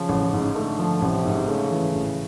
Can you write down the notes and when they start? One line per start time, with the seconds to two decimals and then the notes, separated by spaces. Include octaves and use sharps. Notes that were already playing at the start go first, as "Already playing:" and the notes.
Already playing: C#3 F3
0.09 A1
0.33 G#2
0.55 D3 A3
0.79 F3
1.02 A1 C3
1.25 G#2
1.48 C#3 A3
1.71 E3
1.95 A1